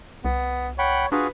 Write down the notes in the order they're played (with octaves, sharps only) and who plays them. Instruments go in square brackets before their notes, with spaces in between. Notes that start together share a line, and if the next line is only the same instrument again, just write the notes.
[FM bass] C2 [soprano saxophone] B3
[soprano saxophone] C#5 [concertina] F#5 G5 B5
[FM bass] D4 [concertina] F4 F#4 G#4 [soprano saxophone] B4